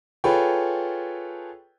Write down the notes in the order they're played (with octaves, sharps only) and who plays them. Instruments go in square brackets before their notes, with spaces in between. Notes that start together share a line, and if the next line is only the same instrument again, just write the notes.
[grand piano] F4 G#4 A4 B4 C#5 G5